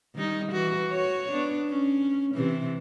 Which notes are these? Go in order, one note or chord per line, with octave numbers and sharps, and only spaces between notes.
D#3 G3 D#4
E3 F#4
F#4 C#5
B3 D4
C#4
C3 E3